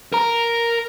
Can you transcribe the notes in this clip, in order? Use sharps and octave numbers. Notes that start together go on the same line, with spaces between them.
A#4 A#5